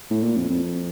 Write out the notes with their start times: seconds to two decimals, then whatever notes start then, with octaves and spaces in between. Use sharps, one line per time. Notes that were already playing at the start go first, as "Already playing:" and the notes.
0.10 A2
0.23 A#2
0.36 F2
0.49 F2